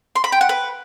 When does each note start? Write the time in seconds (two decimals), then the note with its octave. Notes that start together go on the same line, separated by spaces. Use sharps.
0.16 C6
0.24 B5
0.32 G5
0.41 F#5
0.49 B4